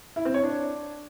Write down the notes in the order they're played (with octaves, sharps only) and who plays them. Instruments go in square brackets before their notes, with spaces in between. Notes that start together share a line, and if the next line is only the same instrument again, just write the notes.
[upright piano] E4
C4
C#5
D4